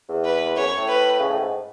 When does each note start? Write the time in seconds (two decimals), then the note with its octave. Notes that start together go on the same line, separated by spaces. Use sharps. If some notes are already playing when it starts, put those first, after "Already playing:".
0.09 E2
0.25 B4
0.56 F#2 C#5
0.77 A2
0.87 B4
1.19 C#3
1.29 A2
1.39 G#2